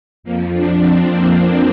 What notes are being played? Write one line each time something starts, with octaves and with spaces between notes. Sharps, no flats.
F2 F3 A#3
D4
C4
A#3